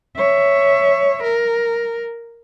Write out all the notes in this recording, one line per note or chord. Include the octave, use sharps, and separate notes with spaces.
C#5 E5
A#4